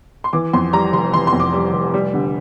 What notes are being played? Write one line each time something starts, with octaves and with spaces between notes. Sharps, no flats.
C6
E3 D6
F2 C6
G3 A#5
F1 C6
E3 C6
C6
F2
D6
G3
F1
G3
D3